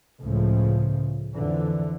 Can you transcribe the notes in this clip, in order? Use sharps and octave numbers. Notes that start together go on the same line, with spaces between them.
C#2 A2 C#3 F3
F2 D3 E3